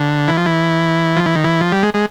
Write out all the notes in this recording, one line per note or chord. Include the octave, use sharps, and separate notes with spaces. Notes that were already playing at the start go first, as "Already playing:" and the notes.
Already playing: D3
E3
F3
E3
F3
E3
D#3
E3
F3
G3
G#3
G#3